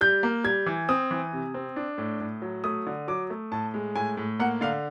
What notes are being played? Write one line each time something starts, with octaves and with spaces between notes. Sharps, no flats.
G3 G6
A#3
G3 G#6
E3
C4 D#6
E3
C3
C4
D4
A2
A2
F#3
A3 D#6
D3
F#3 D6
A3
A2 A5
G#3
A2 G#5
A2
A#3 F#5
D3 F5